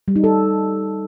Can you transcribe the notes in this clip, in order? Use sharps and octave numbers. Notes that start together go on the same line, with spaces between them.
G3
D#4
A4